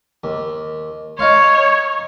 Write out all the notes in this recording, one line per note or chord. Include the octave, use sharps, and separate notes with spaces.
D#2
D#4 C#5 F5 C6